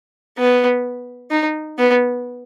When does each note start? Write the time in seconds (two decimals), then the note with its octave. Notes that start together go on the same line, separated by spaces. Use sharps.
0.38 B3
1.31 D#4
1.78 B3